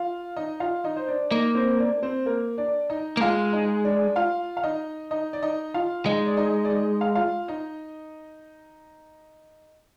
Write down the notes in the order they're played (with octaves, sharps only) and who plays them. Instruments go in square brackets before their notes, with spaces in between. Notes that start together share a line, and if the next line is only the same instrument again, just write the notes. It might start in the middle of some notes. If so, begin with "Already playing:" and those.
Already playing: [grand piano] F4 F5
D#4 D#5
F4 F5
D#4 D#5
C5
D4 D5
[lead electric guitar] A#3 [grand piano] D#4 D#5
[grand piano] C4 C5
D4 D5
C4 C5
A#3 A#4
D4 D5
D#4 D#5
[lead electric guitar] A#3
[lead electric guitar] G#3 [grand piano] F4 F5
[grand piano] D#4 D#5
D4 D5
F4 F5
F5
D#4 D#5
D#4 D#5
D5
D#4 D#5
F4 F5
[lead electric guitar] G#3 [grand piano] D#4 D#5
[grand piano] D5
D#4 D#5
D5
D#4 D#5
F5
F4 F5
D#4 D#5